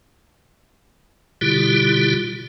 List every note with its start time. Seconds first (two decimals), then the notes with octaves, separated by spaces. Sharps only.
1.41 B2 D3 G3 E4 F4 G4